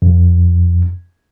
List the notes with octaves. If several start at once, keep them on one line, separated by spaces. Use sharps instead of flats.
F2